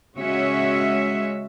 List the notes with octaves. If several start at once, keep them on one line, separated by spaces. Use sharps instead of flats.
C#3 G#3 C#4 F#4 C#5 E5